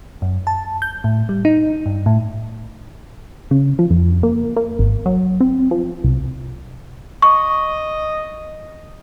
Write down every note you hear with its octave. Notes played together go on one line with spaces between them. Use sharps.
F#2
A5
G6
A2
G3
D#4
G2
A2
C#3
F3
F2
A#3
A#3
G#1
F#3
C4
F3
C2
D#5 C#6